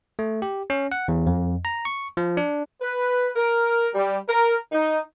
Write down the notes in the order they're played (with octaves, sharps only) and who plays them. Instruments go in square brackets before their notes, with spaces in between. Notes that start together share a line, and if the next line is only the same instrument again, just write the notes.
[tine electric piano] A3
G4
C#4
F#5
E2
F2
A#5
C#6
F3
D4
[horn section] B4
A#4
G3
A#4
D#4